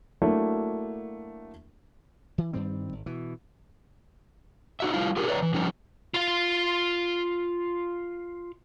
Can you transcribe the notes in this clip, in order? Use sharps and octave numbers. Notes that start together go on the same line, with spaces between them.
F#3 A3 A#3 D4 E4 F#4
E3
G2 D#3 G3 C4
G#1
B2 E3
D#4 F#4 E5
G3 E4 F4 F5
F4 G4 G#4 A#4
B4 C#5 D5 E5 A#5
E3
F3 G3 C#4 D#4
F4 F5